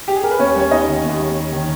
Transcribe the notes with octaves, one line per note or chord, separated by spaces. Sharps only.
G4
G#4
A#4
B4
D#2 C#4 C#5
G3 C#5
D#2 D#4 D#5
D#3
D#2
G3
D#2
D#3